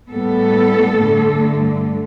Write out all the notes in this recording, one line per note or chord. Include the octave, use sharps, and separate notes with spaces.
A2 G3 B3 A4
G2 D3 A3